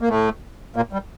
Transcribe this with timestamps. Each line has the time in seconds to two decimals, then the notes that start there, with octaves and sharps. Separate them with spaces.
0.01 A#3
0.09 A2 A3
0.76 A#2 A#3
0.93 G3